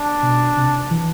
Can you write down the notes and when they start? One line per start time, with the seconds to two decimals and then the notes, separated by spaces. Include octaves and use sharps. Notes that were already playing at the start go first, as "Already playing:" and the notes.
Already playing: D4
0.22 B2
0.57 C3
0.90 E3